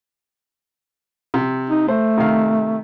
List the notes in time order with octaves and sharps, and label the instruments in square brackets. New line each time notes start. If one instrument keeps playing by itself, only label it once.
[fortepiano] C3
[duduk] D#4
[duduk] A3 [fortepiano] C5
[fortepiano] C3 D#3 F5